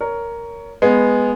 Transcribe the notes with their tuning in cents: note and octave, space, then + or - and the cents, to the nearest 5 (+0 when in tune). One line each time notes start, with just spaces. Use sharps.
A#4 +0 C#5 +20
G#3 +0 B3 +0